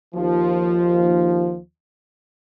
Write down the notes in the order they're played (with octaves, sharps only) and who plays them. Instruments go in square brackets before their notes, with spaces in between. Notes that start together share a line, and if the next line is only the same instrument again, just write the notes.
[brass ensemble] D#2 F3